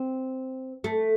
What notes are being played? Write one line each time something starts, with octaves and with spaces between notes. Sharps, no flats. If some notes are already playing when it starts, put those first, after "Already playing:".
Already playing: C4
A3